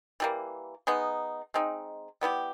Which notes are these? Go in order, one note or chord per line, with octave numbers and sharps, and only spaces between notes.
E3 G3 A#3
G#3 B3 D#4
G#3 C4 D#4
G3 B3 E4 G4